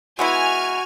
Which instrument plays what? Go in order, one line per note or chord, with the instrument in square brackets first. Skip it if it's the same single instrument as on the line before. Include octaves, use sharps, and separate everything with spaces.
[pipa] G#3 B3 E4 [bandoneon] F#4 [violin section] G#5 F6